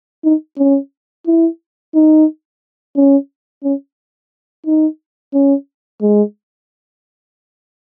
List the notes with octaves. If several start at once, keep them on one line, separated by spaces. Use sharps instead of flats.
D#4
C#4
E4
D#4
C#4
C#4
D#4
C#4
G#3